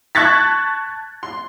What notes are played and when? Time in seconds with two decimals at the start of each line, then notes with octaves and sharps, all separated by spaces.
0.15 A5 C#6 F#6 G#6 A6 B6
1.23 C6